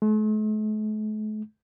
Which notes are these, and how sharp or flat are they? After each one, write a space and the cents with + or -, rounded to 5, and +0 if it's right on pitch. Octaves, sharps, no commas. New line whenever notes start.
A3 -45